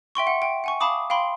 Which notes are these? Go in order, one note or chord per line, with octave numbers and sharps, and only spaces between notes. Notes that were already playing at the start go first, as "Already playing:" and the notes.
E5 G5 C6 C#6
F#5
G5
F#5 G#5 C#6
F5 A5 B5 D6 D#6
F5 G5 B5 C6